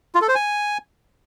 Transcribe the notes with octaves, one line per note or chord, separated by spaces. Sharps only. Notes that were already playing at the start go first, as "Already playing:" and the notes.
F4
A4
C5
G#5